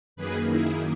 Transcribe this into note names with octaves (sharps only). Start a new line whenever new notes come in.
F#2 D#3 A#3 G#4 B4
E4 G#4